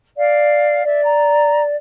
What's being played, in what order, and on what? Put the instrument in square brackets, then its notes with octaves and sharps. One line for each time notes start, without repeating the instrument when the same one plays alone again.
[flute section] D5 F5
[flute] D5 [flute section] E5
[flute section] A#5